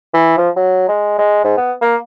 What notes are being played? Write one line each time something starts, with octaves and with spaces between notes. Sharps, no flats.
E3
F3
F#3
G#3
G#3
G#2
B3
A#3